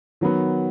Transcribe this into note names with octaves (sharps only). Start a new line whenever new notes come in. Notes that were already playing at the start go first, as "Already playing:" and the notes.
D#3 F#3 B3